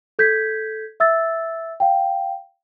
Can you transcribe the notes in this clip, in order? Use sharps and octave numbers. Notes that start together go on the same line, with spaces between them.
A4 G6 G#6 B6
E5 E6 A6
F5 G5